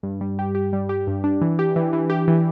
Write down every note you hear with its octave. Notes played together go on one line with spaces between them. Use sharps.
G2
G3
G4
G4
G3
G4
G2
D4
E3
G4
E3
E3
G4
E3